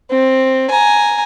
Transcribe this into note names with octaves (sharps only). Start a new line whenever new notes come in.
C4
G#5 A#5